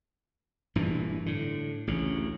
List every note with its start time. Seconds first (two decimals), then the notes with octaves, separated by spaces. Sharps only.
0.75 E1 G2 A#2 E3
1.26 A2 D3
1.87 A1 D2 C#3